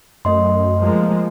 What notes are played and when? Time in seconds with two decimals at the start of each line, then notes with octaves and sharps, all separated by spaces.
0.25 F#2 A3 D#5 C6
0.82 F3 G#3 A#3